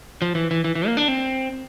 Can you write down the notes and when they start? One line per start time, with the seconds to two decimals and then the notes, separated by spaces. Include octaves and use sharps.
0.22 F3
0.35 E3
0.51 E3
0.64 E3
0.75 E3
0.87 A#3
0.97 D4
1.08 C4